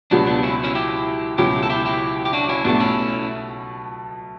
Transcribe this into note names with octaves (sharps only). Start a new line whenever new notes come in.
C#2 B2 F#3 B3 D4
B3 D4
C#4 E4
C#4 E4
E4 G4
C#2 B2 F#3 C#4 E4 G4
A4
E4 G4
E4 G4
G4
D4 F#4
C#4 E4
B1 B2 A3 B3 D4
C#4 E4